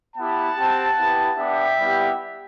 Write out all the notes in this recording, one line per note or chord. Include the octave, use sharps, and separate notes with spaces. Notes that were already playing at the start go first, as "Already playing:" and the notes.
B3 E4 G4 F#5 A5
C4 G4
B3 E4 G4
B3 D4 G4 E5 G5
G3 B3 E4 G4